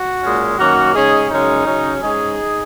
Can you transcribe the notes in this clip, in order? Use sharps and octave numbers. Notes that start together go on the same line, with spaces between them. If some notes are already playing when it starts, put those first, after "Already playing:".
Already playing: F#4
A#2 G#3 C#4
F#2 D#3 A#3 C#4 F#4
C#3 G#3 C#4 D#4 G#4
F#2 C#3 G#3 C#4 D#4
C#3 F#3 C#4
G#2 G#3 C#4 D#4 G#4